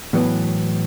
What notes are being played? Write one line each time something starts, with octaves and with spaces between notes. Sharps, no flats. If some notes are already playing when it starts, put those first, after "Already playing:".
A2 E3 F#3 B3